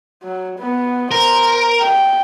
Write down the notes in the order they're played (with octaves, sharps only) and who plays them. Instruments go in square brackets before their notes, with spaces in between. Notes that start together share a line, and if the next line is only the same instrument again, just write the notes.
[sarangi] F#3
B3
[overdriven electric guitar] A#4 [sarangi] C5
[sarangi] G5